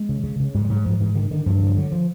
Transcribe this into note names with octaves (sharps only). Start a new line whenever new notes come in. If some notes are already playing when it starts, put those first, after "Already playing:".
Already playing: G#3
C#3
C#3
C#3
G#2 G3
G3
G#2 F#3
G#2 F3
G#2 E3
D3 D#3
D3 D#3
G2 F3
E3
D3 F3
D3 F#3
F3